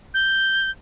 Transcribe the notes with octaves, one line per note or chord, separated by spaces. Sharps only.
G6